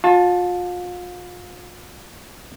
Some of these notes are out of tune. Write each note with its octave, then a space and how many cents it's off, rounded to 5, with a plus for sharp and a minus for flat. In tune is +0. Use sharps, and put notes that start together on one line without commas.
F4 +35 A5 -5